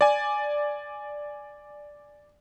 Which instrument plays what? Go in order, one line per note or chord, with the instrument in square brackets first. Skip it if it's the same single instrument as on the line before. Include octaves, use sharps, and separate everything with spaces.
[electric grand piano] D5 G#5